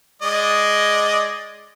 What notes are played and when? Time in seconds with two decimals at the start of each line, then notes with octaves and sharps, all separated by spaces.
0.22 G#3 D5 D#5